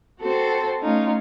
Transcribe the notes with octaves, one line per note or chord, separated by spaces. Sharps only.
C4 F#4 A4 C5
A3 C#4 D#4 F4